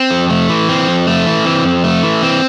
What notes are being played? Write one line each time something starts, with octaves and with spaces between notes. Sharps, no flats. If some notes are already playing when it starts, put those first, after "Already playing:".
Already playing: C4
F2
A3
E3
C4
F2
A3
E3
C4
F2
A3
E3
C4